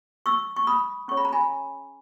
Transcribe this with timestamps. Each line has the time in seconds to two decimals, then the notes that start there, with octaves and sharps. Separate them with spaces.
0.26 C#6 E6
0.57 C#6
0.67 B5 D#6
1.08 C#4 G#4 C#5 C#6
1.17 B5
1.25 A#5
1.33 G#5 B5